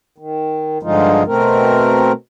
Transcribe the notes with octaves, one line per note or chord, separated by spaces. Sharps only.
D#3
G2 D3 F3 G#3 D#4 F4
B2 A3 C4 A#4